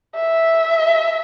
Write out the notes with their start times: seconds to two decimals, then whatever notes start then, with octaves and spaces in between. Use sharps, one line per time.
0.15 E5